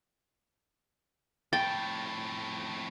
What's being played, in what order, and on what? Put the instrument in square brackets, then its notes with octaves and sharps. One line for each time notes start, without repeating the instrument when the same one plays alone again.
[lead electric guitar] F2 A2 [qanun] G5 [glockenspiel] A6